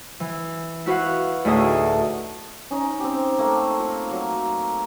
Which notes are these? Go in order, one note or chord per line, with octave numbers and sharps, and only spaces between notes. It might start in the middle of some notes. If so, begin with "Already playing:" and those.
E3
E4 F#4 B4 F5 F#5
D2 A2 D#4 G#4 E5 D#6
C#4 D#4
C4 G4
A3 A#3
D#4 F4 C#6
F#3